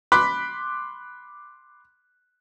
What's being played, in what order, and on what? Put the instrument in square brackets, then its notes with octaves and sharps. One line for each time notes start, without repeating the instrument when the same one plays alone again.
[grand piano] B5 C6 D6 F#6 B6